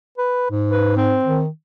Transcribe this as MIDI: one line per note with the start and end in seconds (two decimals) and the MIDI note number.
0.18 0.48 71
0.51 1.18 44
0.71 0.92 71
0.97 1.40 60
1.25 1.47 51